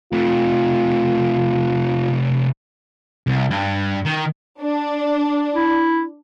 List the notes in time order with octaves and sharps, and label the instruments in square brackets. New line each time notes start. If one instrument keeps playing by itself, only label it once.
[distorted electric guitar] C3 A3 [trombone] F4
[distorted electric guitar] C2
G2
D#3
[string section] D4
[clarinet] E4